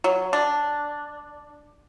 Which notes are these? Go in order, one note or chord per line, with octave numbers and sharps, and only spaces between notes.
F#3
D4